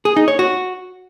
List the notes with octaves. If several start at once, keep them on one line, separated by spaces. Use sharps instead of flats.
G#4
D#4
C#5
F#4